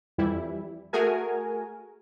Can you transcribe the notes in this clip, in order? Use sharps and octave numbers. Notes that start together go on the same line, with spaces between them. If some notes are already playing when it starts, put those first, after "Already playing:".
F2 E3 G3 E4
A3 F#4 G#4 A#4 G#5